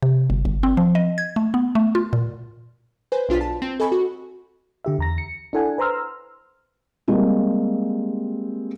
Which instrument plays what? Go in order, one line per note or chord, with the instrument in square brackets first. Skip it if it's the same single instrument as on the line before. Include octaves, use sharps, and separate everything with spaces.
[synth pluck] C3
G1
G1
C4
F3
D#5
G#6
A3
B3
A3
F4
A#2
[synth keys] B4 C5 G#5
B1 D4 F4 A6 B6
A5
C4
A4 D#5 G#5 B5 C#6
F#4
[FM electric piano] D3 G4 E5
E2 A#5 A#6
C#7
D4 E4 A4 F#5 G#5
B4 C5 A#5 C6 E6 F6
[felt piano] G3 G#3 A#3 C4 G4